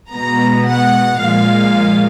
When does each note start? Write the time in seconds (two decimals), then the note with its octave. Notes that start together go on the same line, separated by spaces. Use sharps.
0.12 B2 G#3 B3 A#5
0.67 F#5
1.20 A#2 F3 G#3 F5